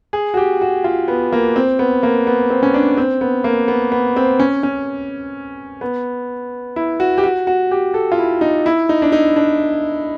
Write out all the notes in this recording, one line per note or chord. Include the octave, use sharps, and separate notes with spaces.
G#4
F#4
G4
F#4
F4
B3
A#3
C4
B3
A#3
B3
C4
C#4
D4
C4
B3
A#3
B3
B3
C4
C#4
C#4
B3
E4
F#4
G4
F#4
F#4
G4
A4
F4
E4
D#4
E4
D#4
D4
D#4
D4